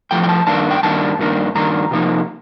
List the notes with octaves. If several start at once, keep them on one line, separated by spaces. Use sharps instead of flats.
A2 F3 A3 G5
G5
A5
G2 D#3 A#3 D4 A5
G5
G2 D#3 A#3 D4 A5
G2 D#3 A#3 D4
G2 D#3 A#3 D4 A#5
C3 F3 A#3 D#4